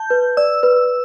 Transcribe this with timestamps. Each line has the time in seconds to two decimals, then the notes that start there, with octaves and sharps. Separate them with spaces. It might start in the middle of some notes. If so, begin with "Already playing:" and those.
Already playing: A5 G6
0.10 B4
0.37 D5 E6
0.63 B4